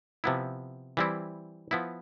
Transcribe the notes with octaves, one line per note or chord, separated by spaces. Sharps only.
C3 F3 B3 E4
E3 G3 C4 E4
F3 B3 E4